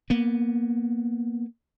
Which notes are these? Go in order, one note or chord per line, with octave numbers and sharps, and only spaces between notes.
A#3 B3